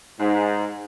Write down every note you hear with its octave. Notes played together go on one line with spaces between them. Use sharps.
G#2